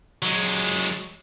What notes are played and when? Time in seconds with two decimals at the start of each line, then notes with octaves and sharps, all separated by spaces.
0.23 F#3 G#3